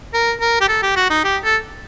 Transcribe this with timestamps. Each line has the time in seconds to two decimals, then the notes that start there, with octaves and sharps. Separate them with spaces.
0.14 A#4
0.40 A#4
0.61 G4
0.69 A4
0.83 G4
0.96 F#4
1.10 D#4
1.24 G4
1.43 A4